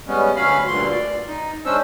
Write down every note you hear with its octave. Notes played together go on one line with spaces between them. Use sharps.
G3 G#3 B3 C#4
D2 F#3 C#4 F5 B5
D2 G2 A#2 D3 C6
D5
D#4
G#3 C#4 D4 C5 E6